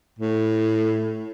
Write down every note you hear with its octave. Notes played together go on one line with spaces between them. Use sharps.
A2